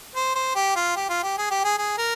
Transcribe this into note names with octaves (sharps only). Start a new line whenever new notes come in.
C5
C5
G4
F4
G4
F4
G4
G#4
G4
G#4
G#4
A#4